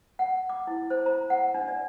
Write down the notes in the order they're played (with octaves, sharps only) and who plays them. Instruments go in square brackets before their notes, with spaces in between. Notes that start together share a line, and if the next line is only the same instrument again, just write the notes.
[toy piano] F#5
D6
E4
C5
A#5
F#5
D4
D5